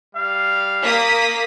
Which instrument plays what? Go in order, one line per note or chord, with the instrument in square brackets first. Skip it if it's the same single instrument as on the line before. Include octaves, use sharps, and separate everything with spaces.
[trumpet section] G3 F5
[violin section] A#3 D#6 B6